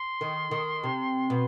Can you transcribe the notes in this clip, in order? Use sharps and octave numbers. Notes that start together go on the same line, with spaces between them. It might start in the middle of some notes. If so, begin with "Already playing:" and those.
Already playing: C6
D#3
D#3
C3
B2